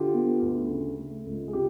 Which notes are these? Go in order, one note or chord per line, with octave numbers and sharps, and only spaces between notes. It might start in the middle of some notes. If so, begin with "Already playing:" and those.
Already playing: D3 F4 G4
B3
D2
C#3
A3
C#2
G#4
C3 F4 G4